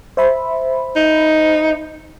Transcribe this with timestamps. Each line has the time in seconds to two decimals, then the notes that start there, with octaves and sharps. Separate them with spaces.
0.17 C5 E5 B5
0.96 D#4